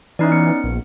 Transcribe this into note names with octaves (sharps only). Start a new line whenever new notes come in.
E3 C#4 D#4 D5
B3 C#7
A#1